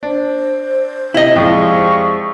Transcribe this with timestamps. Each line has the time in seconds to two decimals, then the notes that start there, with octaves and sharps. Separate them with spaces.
0.03 D4 C5
1.14 C3 E4 D#5
1.36 F2 F3 G3 G#3 F5 C#6